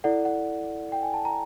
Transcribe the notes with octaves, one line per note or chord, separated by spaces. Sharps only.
E4 A4 D5 F#5
F#5
G5
G#5
A5
A#5